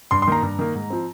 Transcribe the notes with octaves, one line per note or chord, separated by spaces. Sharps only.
G2 C6
C6
D#3 A#3 A#5
G2
D#3 A#3
G#2
F3 C4